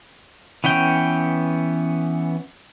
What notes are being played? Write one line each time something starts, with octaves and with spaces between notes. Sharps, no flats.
E3 B3 C#4 G5